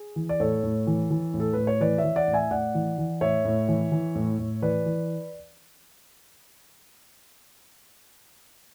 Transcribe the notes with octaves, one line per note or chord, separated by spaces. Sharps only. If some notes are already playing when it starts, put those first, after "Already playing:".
Already playing: G#4
E3
D5
A2 A4 C#5
A2
E3
E3
A2
A4
A2 B4
C#5
E3 B4 D5
C#5 E5
E3
D5 F#5
A2
E5 G#5
A2 D5 F#5
E3
E3
A2 C#5 E5
A2
E3
E3
A2
A2
E3 B4 D5
E3